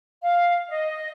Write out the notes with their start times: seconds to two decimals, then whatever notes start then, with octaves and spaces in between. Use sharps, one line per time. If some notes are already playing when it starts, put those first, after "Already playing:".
0.22 F5
0.68 D#5